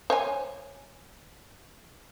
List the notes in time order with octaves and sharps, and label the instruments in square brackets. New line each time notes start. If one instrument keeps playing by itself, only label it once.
[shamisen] C5 C#5 G#5